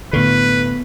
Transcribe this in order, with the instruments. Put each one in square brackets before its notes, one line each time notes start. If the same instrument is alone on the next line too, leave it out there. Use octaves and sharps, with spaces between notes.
[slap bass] A2 D3 [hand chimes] B3 C#6 C7 [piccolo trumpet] B4